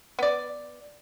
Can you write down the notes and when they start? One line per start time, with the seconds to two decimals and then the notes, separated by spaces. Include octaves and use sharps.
0.19 B3 D5